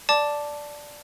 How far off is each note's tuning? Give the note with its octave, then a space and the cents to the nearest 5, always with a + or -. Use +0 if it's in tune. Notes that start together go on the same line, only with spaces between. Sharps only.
D5 +0 A5 +0 D6 +0